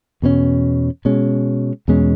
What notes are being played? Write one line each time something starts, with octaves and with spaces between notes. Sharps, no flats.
E2 B2 A#3 C#4
B2 G#3 C#4
E2 B2 G#3 C#4